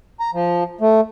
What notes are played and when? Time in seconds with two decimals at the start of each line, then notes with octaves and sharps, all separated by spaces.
0.20 A#5
0.34 F3
0.81 A3